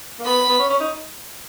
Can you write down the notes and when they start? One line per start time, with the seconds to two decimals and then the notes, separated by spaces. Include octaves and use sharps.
0.20 A#3
0.25 B3 B5
0.49 B3
0.59 C#4
0.70 C#4
0.80 D#4